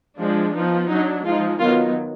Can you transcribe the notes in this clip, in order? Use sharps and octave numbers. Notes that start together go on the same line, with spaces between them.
F3 G#3 D4
F3 B3 D#4
F#3 D4 D#4
F3 G#3 D#4 F4
D#3 F#3 B3 D#4 F4